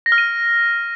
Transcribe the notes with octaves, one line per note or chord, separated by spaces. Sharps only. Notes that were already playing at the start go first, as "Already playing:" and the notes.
A#6
F6
D#7